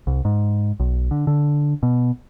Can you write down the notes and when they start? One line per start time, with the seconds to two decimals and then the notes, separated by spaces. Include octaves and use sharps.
0.07 C2
0.25 G#2
0.80 B1
1.11 D3
1.27 D3
1.83 B2